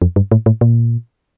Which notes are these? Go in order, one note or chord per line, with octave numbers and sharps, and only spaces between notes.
F2
G2
A2
A2
A#2